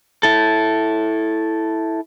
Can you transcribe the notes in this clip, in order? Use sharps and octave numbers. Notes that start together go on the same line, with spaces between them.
E4 A4